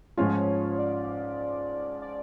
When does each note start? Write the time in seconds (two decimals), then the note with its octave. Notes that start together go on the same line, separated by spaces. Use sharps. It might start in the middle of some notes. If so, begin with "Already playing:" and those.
0.17 G#2 F3 G#3 C#4 F4 C#5
0.79 D5
2.02 D5